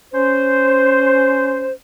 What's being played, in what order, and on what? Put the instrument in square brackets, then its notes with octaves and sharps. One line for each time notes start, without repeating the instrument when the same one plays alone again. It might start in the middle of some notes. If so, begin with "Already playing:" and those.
[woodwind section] C#4 C5